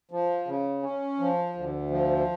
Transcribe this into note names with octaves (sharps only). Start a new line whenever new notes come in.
F3
C#3
C#4
F3
D2
F3